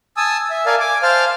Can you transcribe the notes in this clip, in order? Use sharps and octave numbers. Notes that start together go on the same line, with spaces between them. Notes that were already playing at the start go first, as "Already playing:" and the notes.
G#5 A5 D#6 E6
E5
A#4 D5 F5 G#5 A5
G#5 D6
C5 F5 A5 F6